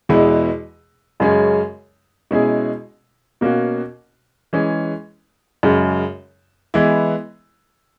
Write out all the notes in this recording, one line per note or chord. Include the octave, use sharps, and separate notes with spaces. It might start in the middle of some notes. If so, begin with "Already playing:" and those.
E2 B2 G#3 B3 E4
F#2 C#3 G#3 C#4 G#4
B2 G#3 C#4 E4 G#4
B2 A#3 C#4 F#4
E3 G#3 C#4 G#4
F#2 C#3 G#3
E3 G#3 B3 E4